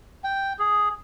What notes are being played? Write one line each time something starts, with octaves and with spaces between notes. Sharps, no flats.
G5
G#4